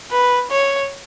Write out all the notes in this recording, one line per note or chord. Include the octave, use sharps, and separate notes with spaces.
B4
C#5